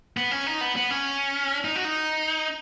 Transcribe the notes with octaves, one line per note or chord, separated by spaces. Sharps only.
B3
C#4
D#4
B3
B3
C#4
D#4
F#4
D#4